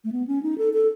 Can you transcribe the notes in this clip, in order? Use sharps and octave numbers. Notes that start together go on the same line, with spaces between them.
A3
B3
C#4
D#4
A4
A4